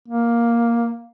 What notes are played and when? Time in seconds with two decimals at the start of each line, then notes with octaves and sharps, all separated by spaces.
0.08 A#3